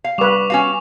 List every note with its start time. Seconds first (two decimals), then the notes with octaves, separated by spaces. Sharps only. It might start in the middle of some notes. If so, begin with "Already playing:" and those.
0.04 F5
0.18 G3 B4 C#6 D6 F7
0.50 C#4 F#4 F5